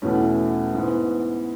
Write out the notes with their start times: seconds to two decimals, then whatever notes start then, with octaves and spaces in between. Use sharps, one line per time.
0.02 E2 B2 A3 C#4 E4
0.74 G#2 E3 B3